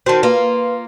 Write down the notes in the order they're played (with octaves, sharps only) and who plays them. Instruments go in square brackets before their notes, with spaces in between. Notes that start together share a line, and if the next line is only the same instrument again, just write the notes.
[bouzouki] D#3 C4 [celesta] F#4 A5
[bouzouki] A#3 F4 [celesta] B4